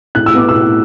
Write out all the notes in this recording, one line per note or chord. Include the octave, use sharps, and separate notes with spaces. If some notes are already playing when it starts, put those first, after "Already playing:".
A2 F#6
E6
B3 D6
E6
A2